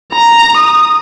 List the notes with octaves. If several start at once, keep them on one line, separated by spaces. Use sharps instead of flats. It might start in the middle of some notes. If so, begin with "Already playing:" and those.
A#5
D#6